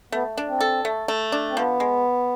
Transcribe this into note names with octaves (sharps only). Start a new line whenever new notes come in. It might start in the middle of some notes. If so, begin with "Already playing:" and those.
A3 B3
D4
C4
A4
A3
A3
D4
C4
F3 B3
G#3